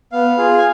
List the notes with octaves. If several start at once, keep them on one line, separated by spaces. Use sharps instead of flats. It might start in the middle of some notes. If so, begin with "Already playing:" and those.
B3 F5
F4 G#4
G#5